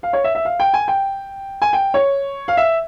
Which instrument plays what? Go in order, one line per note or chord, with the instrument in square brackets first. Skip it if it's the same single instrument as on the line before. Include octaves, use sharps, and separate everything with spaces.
[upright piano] F5
C#5
E5
E5
F5
G5
G#5
G5
G#5
G5
C#5
F5
E5